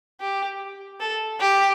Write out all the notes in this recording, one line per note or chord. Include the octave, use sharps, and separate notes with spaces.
G4
A4
G4